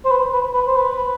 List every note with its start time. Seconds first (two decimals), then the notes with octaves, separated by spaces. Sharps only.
0.05 C5
0.10 B4
0.32 B4
0.54 B4
0.67 C5
0.76 B4